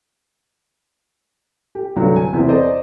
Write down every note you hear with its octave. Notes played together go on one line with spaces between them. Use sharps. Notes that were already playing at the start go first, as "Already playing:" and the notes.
G4
C2 G2 D3 F#3
G#5
E2 C3 C4 E4
C5 D5 D#5